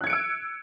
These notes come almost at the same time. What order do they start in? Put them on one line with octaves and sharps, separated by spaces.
F#6 G#6 C#7 D7 E6